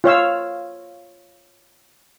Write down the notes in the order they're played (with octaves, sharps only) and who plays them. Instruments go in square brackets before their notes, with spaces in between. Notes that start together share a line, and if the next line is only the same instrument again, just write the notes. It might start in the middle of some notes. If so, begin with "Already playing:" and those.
[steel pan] F4 C#5 F5 E6